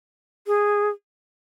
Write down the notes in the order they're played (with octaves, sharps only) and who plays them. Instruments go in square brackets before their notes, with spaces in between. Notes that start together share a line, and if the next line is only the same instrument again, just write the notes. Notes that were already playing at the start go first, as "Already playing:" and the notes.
[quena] G#4